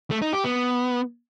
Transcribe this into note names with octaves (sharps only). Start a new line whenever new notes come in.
A3
D#4
G4
B3